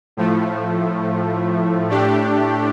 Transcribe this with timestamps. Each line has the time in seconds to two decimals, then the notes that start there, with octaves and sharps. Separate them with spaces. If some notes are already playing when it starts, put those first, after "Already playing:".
0.17 A2 F3 A3
1.88 A2 A3 D4 G4